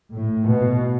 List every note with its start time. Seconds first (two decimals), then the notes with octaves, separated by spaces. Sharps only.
0.14 A2
0.48 B2